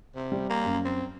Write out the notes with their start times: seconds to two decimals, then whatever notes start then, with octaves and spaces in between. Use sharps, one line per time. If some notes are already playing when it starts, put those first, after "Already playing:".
0.15 C3
0.32 G3
0.49 A#3
0.65 F#2
0.85 C4